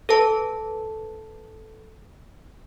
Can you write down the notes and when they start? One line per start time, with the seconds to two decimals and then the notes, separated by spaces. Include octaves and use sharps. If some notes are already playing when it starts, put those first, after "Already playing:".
0.09 A4 B4 A5